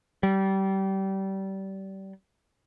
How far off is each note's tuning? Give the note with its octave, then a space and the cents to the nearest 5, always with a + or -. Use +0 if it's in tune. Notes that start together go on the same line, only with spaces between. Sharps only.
G3 -25